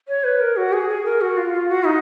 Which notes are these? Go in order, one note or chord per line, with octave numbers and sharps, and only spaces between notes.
C#5
B4
A#4
F#4
G#4
G#4
A#4
F#4
F4
F4
F#4
D#4